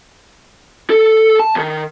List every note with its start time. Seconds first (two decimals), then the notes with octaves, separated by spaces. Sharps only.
0.90 A4
1.40 A5
1.55 D#2 D#3